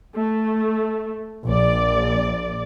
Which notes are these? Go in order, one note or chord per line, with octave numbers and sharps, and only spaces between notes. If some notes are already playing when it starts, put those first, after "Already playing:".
A3
A#1 D5